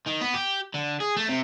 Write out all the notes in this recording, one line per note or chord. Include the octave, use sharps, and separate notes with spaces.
D#3
B3
G4
D3
G#4
A3
C3